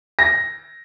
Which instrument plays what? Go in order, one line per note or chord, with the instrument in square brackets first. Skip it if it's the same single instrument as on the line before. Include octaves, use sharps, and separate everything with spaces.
[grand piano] A#6